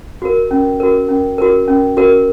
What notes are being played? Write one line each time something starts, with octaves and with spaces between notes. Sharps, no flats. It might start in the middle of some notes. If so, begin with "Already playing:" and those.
F#4 A#4
C#4
F#4 A#4
C#4
F#4 A#4
C#4
F#4 A#4